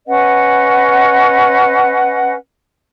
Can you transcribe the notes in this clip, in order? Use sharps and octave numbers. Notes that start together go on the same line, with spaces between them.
C#4 B4 D#5 F#5